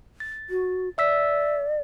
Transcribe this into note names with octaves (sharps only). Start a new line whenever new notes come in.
A6
F#4
D5 E5 E6 B6